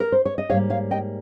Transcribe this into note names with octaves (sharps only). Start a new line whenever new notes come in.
A#4
C5
C#5
D#5
G#2 G3 A#3 C#5 F5
C#5 F5
D#5 G5